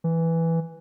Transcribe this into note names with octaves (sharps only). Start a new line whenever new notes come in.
E3